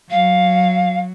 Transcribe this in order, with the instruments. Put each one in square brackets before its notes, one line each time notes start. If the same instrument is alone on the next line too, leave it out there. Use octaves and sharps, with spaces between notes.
[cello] F#3 [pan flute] F5